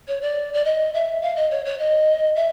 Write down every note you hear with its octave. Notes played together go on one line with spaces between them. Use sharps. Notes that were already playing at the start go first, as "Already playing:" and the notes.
C#5
D5
D5
D#5
E5
F5
D#5
C#5
C#5
D#5
E5